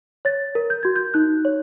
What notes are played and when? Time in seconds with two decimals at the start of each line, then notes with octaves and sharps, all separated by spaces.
0.25 C#5 A6
0.55 A#4
0.70 G6
0.83 F#4 G#6
0.96 G6
1.14 D#4 F#6
1.45 C#5